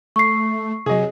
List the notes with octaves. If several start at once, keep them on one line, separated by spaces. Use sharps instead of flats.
A3 C#6 C7
C3 F#3 G#4 D#5